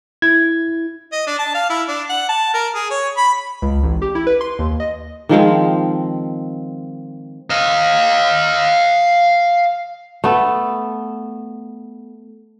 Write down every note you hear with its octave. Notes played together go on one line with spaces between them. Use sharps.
E4 G#6
D#5
D4
A5
F5
E4
D4
F#5
A5
A#4
G#4
C#5
B5
C#2
A1
G4
E4
B4
C6
D#2
D#5
D#3 F3 G#3 C4
D#5 F5
A3 B3 A4